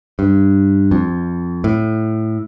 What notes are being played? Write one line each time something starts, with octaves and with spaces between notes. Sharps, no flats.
G2
F2
A2